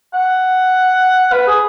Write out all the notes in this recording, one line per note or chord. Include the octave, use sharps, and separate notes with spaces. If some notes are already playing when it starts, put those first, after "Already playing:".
F#5
B4
G#4